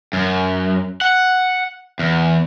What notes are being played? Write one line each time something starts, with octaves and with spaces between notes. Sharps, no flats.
F#2
F#5
E2